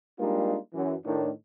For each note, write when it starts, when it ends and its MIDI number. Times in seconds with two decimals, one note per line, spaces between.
0.19 0.57 55
0.19 0.57 56
0.19 0.57 58
0.19 0.57 62
0.19 0.57 63
0.19 0.57 65
0.74 0.94 42
0.74 0.94 52
1.05 1.30 45
1.05 1.30 51
1.05 1.30 62